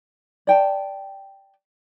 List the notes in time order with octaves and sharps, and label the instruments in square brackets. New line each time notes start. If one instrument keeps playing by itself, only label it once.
[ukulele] D5 G5 A5